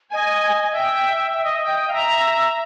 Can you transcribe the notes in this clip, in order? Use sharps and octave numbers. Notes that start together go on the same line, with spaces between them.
D#5 G#5
E5 G5
E5
D#5
D#5 G5
F5
E5 A#5